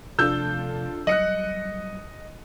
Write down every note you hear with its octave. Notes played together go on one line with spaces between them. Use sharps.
C3 F3 A3 D4 F4 A4 E6 G6
F#3 G3 D#5 F#6 C#7 F#7